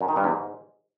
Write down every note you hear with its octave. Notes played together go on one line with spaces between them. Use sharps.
F#2
D#3
G2
E2
G#2